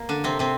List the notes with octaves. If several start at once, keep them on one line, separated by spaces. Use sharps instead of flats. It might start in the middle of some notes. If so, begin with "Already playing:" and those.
Already playing: A#3
D3 D4
C3 C4
C3 C4